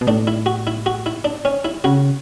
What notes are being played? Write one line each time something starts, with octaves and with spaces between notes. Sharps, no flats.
B2
A2 D4
E4
F#4
E4
F#4
E4
D4
C#4
E4
C#3 F#4